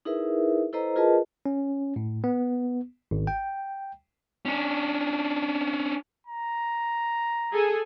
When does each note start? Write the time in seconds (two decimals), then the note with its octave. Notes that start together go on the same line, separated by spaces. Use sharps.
0.05 D#4 E4 G#4 A#4 B4 E5
0.73 E4 A4 B4 C5 D#5 A#5
0.96 F4 G#4 A#4 B4 D#5 A5
1.46 C#4
1.96 A2
2.24 B3
3.11 G#1
3.27 G5
4.46 C#4 D4
6.27 A#5
7.52 G#4 A4 G#5